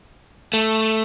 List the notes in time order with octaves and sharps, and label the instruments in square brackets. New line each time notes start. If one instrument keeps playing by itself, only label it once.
[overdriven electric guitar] A3